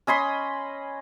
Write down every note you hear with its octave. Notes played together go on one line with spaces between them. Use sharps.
C#4 D#5 B5 C6